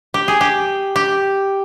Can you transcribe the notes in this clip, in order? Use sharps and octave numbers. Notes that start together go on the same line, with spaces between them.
G4
G#4
G4
G4